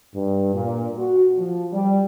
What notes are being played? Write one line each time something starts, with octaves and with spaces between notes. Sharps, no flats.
G2
A#2
F#4
F3
G3